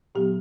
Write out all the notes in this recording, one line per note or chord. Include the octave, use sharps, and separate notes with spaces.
A#2 F#3 B3 G4